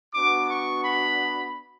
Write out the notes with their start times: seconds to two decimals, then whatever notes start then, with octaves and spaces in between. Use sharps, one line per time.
0.14 B3 D4 F#4 D6
0.49 C#6
0.84 B5